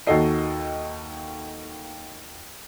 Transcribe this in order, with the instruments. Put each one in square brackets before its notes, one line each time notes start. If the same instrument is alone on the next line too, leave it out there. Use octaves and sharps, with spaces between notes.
[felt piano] D#2 D#3 F#4 A4 D#5 C7